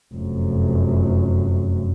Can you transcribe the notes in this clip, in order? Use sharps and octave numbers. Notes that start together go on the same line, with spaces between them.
F1 F#2